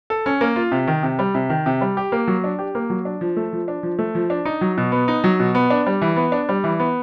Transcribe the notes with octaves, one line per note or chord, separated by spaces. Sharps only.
A4
C#4
A#3
F4
C3
D#3
C3
G3
C3
D#3
C3
G3
G4
A#3
F#3
D4
G4
A#3
F#3
D4
F3
A3
F3
D4
F3
A3
F3
D4
D#4
F#3
B2
B3
D#4
F#3
B2
B3
D4
G3
E3
B3
D4
G3
E3
B3